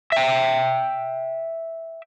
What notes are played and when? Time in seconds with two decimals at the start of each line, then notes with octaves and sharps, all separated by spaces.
0.12 E5 G5